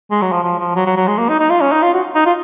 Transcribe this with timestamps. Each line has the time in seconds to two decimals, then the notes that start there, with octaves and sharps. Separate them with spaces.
0.11 G#3
0.22 F#3
0.32 F3
0.44 F3
0.59 F3
0.75 F#3
0.86 F#3
0.97 F#3
1.08 G#3
1.18 A#3
1.29 D#4
1.40 D#4
1.50 F4
1.61 C#4
1.72 D#4
1.82 F4
1.93 F#4
2.15 D#4
2.26 F4